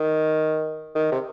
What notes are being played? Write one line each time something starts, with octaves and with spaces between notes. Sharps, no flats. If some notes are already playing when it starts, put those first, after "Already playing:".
Already playing: D#3
D#3
C3